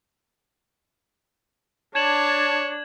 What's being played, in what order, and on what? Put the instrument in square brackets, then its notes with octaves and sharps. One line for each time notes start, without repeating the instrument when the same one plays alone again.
[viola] D4 [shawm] C#5 [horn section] D5 A5 [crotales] G#6 E7 F#7